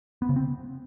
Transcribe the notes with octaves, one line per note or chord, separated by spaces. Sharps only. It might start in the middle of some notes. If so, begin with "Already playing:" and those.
B3
C#3
C4